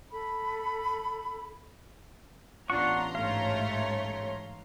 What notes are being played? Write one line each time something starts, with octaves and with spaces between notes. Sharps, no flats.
A4 B5
A1 B3 D4 F4 F#5 A#5 C6 C#6
G#2 A3 C#5 F5